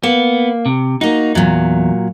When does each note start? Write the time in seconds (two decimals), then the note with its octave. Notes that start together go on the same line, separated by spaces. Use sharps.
0.03 A#3 B3
0.66 C3
1.01 A#3 D#4 F#4
1.35 E2 A#2 F#3